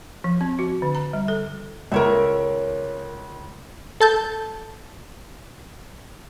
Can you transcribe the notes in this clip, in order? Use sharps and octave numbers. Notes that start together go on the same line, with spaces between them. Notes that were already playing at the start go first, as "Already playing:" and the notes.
F3
C4
F#4
D3
A#5
G3
A4
C#2 A#4 C#5 E5
A4 A5 G6